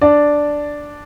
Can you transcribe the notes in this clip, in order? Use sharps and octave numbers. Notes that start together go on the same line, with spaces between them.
D4 D5